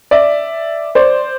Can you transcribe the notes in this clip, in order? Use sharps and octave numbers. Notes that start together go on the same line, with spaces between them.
D5 E5
C5 D5